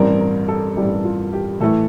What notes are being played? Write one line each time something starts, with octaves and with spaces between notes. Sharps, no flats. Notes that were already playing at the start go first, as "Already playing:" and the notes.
Already playing: A1 G2 E3 G3 C4 A#4
A#4
A4
A1 G2 E3 G3 C4 G4
F4
G4
A2 E3 A3 A4